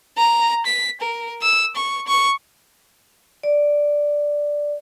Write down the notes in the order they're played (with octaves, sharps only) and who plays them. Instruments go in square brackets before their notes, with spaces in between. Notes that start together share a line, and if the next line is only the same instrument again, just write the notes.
[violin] A#5
B6
A#4
E6
C#6
C#6
[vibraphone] D5